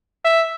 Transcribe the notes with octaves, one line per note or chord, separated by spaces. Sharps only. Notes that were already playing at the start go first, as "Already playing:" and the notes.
E5